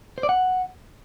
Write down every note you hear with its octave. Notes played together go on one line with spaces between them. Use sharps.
C5
D5
F#5